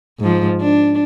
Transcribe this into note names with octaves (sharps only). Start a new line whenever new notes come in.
G#2 F3
D4